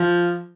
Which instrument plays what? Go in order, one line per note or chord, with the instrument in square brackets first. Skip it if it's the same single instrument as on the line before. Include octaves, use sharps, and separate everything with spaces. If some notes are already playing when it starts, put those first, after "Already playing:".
Already playing: [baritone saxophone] F3